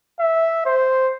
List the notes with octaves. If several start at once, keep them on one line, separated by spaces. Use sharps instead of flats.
E5
C5